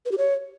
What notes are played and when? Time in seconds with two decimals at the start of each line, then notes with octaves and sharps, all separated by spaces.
0.05 B4
0.12 G4
0.18 C#5